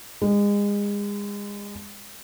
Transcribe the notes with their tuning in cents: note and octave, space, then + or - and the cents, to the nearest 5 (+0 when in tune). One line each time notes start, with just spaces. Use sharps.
G#3 -30